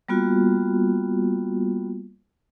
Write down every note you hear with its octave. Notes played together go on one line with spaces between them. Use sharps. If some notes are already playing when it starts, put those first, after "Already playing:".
G3 A#3 B3 F4 F#4